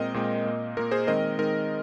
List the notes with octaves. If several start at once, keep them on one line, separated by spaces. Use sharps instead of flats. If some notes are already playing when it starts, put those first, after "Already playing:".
Already playing: A#2 G#3 C4 A#4 D#5
A#2 G#3 C4
A#2 A#3
A#2 A#3 A#4
G#4 C5
D#3 G#3 C4 A#4 D#5
D#3 G#3 C4 A#4